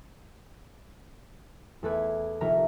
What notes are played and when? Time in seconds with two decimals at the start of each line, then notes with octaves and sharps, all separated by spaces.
1.83 E2 A3 A4 B4 D6 G#6
2.41 D#1 A#1 C3 E5 A#5 F6